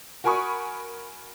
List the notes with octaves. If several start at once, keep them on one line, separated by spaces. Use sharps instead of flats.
F#4 A#4 G#5 B5 C#6 D#6